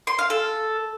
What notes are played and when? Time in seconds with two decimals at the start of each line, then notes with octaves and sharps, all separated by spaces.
0.07 C6
0.19 F5
0.30 A4